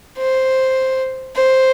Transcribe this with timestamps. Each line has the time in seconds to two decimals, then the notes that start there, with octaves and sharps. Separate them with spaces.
0.18 C5
1.35 C5